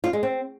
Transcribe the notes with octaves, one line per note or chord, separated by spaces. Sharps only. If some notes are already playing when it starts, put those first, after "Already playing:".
F4
G#3
C4